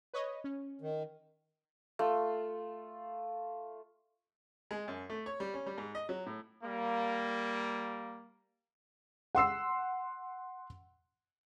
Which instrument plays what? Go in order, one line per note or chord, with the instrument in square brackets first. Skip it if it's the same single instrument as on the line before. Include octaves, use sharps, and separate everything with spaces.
[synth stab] B4 C#5 D#5
C#4
[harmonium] D#3
[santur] A3 F4
[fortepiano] G#3
F#2
A3
C#5
G3
C#4
G3
G#2
D#5
F#3
A2
[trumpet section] G3 A#3
[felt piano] F#5 C6 E6 C7